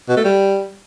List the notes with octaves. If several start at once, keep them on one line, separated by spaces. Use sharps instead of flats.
B2
A3
G3